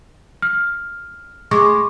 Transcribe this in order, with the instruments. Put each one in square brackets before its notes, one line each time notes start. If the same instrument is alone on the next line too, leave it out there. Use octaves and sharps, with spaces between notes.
[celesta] F6
[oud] G#3 [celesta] C#6 D6